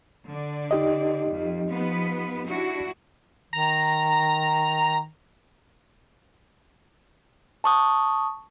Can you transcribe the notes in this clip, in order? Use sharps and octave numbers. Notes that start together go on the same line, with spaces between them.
D3 D5
D#4 G4 D#5
F2
F3 B3 B4
D4 E4 F#4
D#3 A#5
A5 C#6 D#6